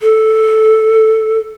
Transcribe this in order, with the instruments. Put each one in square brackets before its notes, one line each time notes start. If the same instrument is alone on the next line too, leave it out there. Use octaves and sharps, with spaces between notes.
[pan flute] A4